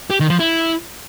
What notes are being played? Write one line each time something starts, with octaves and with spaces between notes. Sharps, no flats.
G4
D#3
F3
E4